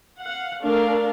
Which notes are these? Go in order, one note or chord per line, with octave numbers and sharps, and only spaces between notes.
F5 F#5
A3 D4 A#4 F5